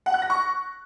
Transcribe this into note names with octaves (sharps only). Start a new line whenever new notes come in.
F#5
F#6
A#6
C#6